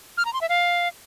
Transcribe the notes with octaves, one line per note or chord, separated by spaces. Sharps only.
F6
A#5
C6
E5
F5